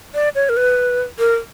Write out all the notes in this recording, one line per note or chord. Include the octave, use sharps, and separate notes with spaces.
D5
C#5
A#4
B4
A#4